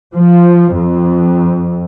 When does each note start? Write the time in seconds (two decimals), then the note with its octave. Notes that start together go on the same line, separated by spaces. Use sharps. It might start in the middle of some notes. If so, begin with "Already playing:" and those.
0.15 F3
0.76 F2